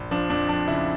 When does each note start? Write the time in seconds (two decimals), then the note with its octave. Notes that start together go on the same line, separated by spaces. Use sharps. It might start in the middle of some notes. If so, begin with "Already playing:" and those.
Already playing: A#1
0.11 F3 D4
0.30 F2 D4
0.49 F2 D4
0.68 C#3 E4